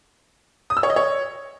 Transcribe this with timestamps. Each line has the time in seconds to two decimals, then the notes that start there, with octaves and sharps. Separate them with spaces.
0.70 D#6
0.77 E6
0.83 C#5
0.90 D#5
0.96 C#5